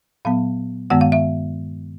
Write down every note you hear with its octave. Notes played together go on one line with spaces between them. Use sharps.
A#2 F#3 B3 F5
G2 D#3 G#3 B3 F#5
F5
E5